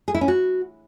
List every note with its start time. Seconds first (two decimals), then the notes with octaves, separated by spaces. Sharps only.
0.08 G#4
0.15 E4
0.21 C#4
0.28 F#4